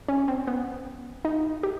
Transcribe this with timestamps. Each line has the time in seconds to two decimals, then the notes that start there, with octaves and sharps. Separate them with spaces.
0.08 C#4
0.28 C4
0.47 B3
1.25 D#4
1.63 G4